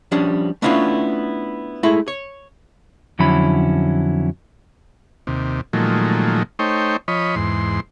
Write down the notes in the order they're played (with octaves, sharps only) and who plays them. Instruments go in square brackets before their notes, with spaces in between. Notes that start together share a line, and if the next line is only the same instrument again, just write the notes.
[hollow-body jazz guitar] F3 G3 C#4 D4
A3 B3 C#4 D4 E4 F4
G#3 A3 E4
C#5
[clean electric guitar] F2 D3 F#3 C#4 E4 B5
[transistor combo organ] D#2 C3
A#2 D#3 F3 F#3 G#3 A3
A3 D#4 C5 C#5 G5
F3 C#5 D#5 B5
E2 G#2 C6